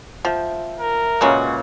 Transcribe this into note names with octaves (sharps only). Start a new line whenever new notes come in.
F3 E5 G5
A#4
A#2 C#3 G#3 F#4 B4 C#5